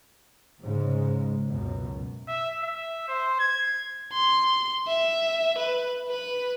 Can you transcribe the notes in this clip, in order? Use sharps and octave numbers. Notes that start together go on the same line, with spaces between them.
G#2 C#3 G#3
C#2 F#2 B2
E5
E5
C5
G#6
C6
E5
B4
B4